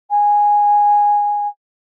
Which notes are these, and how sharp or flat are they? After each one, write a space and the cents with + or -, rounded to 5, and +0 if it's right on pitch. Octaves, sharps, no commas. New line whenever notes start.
G#5 -10